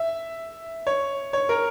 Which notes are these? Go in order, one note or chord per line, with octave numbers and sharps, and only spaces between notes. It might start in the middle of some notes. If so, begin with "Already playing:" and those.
Already playing: E5
C#5
C#5
A#4